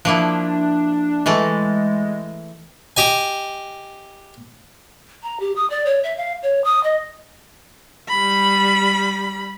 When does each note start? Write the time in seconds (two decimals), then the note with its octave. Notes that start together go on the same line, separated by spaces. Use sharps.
0.05 F3 A#3 D4 E4
1.26 E3 G#3 A3 A4
2.97 G4 D#5 G#5
5.23 A#5
5.40 G4
5.56 D#6
5.70 D5
5.86 C#5
6.04 E5
6.17 F5
6.43 C#5
6.64 D#6
6.84 D#5
8.09 G3 B5